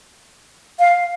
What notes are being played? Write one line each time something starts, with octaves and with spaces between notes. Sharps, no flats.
F5